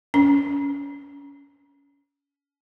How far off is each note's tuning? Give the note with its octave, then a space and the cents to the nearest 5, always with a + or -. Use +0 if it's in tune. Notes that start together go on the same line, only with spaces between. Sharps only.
C#4 +30